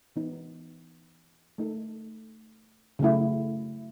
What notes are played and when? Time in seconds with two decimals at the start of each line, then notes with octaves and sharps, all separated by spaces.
0.16 E3 B3 D#4
1.58 A3 D#4 A4
2.99 C#3 F#3 A3 E4